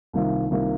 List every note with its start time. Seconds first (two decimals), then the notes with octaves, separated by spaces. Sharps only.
0.13 C2 C3 D#3 A#3 F4
0.50 C2 C3 D#3 A#3 F4